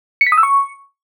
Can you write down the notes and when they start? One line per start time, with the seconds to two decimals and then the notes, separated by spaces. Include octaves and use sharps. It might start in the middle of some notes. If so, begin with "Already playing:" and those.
0.21 C#7
0.27 B6
0.32 D#6
0.38 E6
0.43 C#6